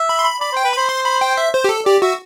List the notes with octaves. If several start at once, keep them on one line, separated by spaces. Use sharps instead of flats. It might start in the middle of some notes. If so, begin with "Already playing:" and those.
Already playing: E5
B5
C6
B5
D5 B5
C5
G5
B4
C5 B5
C6
B5
G5
E5
C5
G4
A4
G4 D5
F#4 E5